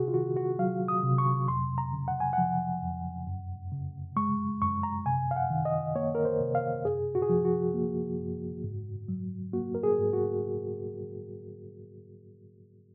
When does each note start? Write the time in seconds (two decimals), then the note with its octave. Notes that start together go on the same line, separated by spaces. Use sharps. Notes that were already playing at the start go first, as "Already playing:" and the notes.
Already playing: C3 F#4 G#4
0.08 F4
0.14 D#3 F#4
0.37 F#4
0.59 F#3 F5
0.88 D#6
1.03 C3
1.18 C#6
1.48 F2 C6
1.78 A#5
1.93 C#3
2.08 F#5
2.20 G#5
2.33 F3 F#5
2.82 F2
3.27 F#2
3.72 C#3
4.16 G#3 C#6
4.62 F#2 C#6
4.83 A#5
5.06 C3 G#5
5.31 F5
5.36 F#5
5.50 D#3
5.65 D#5
5.95 A#3 C#5
6.15 A#4
6.25 C5
6.40 C3
6.55 F5
6.85 F#2 G#4
7.15 F#4
7.22 G#4
7.29 F3 F#4
7.45 F#4
7.74 A#3
8.19 F#2
8.64 G#2
9.08 F#3
9.53 A#3 F#4
9.75 A#4
9.83 G#4
9.98 G#2
10.13 F#4